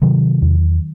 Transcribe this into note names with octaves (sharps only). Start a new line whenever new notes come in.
C3 D#3 F#3
E2